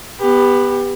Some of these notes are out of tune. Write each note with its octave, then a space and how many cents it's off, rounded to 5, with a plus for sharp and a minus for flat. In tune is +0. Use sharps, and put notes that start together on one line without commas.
B3 +0 G4 +20